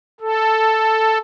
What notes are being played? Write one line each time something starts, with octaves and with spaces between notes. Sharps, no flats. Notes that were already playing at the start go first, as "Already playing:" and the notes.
A4